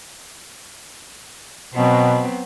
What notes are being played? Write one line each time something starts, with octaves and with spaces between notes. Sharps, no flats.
B2 F#3 B3 C4